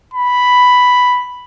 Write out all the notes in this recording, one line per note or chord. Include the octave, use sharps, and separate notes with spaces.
B5